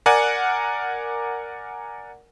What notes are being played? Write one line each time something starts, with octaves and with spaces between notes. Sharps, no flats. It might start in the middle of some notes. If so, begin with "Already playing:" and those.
A#4 D5 F#5 G#5